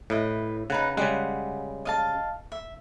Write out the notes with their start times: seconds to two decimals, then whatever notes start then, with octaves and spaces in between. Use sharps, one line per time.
0.10 A2 E4 B4 D#5
0.70 C#3 D#4 B4 F#5
0.97 C#3 G3 G#3 F#5
1.85 D#5 F5 A5
2.52 E5